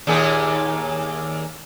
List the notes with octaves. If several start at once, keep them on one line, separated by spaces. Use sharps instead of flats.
D#2 A#2 G#4